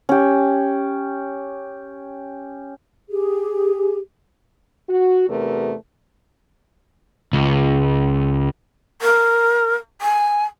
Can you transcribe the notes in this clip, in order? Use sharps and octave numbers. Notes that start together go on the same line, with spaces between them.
C#4 G4
G4 G#4
F#4
E2 C3 A3 A#4 B4
C#2
A#4
G#5